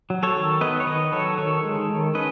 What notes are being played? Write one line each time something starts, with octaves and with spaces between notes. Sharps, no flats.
F#3
A4 C#5
D#3
B3 B4 D#5
C#5
D#3 B4 D#5
F#3 A4 C#5
D#3 A4 C#5
G#3
D#3
C#4 B4 D#5